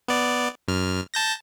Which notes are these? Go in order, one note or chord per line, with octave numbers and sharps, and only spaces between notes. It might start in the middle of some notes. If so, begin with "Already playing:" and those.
B3 D5
F#2 F6
A5 G6 A#6